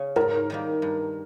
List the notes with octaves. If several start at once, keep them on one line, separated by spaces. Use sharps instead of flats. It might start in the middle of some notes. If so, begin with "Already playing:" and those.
Already playing: C#3 C#4
G#2 A#4
D#3 G3 A#3
G2